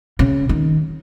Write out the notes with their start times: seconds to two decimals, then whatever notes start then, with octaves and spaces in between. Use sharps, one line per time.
0.19 C#3
0.49 D#3